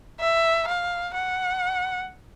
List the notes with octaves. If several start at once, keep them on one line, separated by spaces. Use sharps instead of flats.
E5
F5
F#5